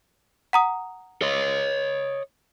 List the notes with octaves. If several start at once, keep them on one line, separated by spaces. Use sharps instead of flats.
F#5 A#5 D#6
C#5 D#5